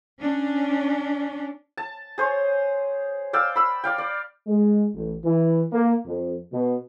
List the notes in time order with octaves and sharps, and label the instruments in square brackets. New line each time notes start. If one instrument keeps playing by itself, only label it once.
[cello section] C#4 D4
[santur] A5
G#4 C5 C#5
D5 F5 G5 E6
B5 E6
D5 F5 G5
D5
[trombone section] G#3
A1
E3
A#3
F2
B2